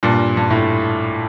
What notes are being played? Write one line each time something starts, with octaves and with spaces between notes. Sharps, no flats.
G2 A#2
G2
A2